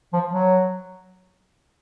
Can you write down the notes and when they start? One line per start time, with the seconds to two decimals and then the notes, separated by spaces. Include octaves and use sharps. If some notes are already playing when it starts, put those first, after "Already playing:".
0.13 F3
0.33 F#3